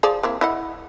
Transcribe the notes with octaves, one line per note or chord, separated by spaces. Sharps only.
F3 G#4 D5
A#3 C4 E4
E4 D#5 F#5